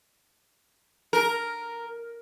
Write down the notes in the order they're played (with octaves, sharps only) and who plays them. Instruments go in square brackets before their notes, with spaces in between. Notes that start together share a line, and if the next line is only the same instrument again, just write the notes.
[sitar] A#4